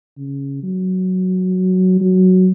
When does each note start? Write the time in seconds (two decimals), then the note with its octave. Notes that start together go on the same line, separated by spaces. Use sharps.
0.17 C#3
0.63 F#3
2.01 F#3